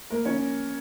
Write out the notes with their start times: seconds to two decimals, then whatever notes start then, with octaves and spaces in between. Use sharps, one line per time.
0.10 A#3 A#4
0.25 C#4 C#5